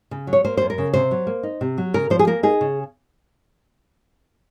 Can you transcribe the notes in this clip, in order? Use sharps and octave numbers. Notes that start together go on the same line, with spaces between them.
C#3
F#3
C#5
A#3 C5
F#2 C5
A#4
C#3
C3 C5
F#3
A#3
D#4
C3
F#3
C#3 A#4
F3 C5
G#4
A#3 A#4
D#4 G#4
C#3